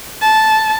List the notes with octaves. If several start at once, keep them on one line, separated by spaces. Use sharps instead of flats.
A5